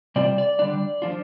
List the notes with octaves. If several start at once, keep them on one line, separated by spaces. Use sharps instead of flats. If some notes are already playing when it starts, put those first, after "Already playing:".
C3 G3 C4 F4 D5
D5
D3 G3 D4 D5
F3 D4 F4